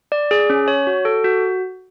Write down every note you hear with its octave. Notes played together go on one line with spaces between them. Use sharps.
D5
G#4
C#4
C#5
F#4
A4
F#4